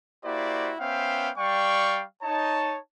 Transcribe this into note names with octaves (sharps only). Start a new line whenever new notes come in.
A#3 E4 F#4 G4 C5 D5
B3 C#4 C5 E5 F5 G5
G3 D5 F5 G5 C#6
D#4 C#5 A5